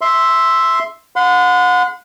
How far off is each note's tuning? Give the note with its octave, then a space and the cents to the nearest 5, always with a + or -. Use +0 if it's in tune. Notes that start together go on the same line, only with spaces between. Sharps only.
E5 +0 C6 +0
F#5 -35 C6 -40